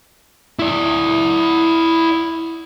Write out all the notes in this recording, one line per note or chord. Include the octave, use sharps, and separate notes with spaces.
E4 D5